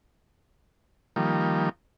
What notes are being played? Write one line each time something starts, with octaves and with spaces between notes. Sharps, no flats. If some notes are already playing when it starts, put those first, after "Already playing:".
D#3 F3 G3 A#3